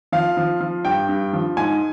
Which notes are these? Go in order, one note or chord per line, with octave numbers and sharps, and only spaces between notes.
F3 F5
F3
F3
G2 G5
G2
F3
G#2 G#5